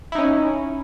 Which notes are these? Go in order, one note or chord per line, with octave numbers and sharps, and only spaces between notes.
C#4 D#4 E4